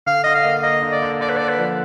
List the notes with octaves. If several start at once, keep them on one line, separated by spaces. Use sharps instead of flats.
D3 F5
D3 D#5
F5
A#3
A#3 D#5
D3
D5
D3
D3 D5
B4
D3 D5
B4
F3